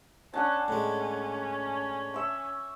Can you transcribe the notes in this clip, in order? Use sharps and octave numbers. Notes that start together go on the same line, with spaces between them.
C#4 D4 F#5 A5
A2 G#3 C#4
E5 C#6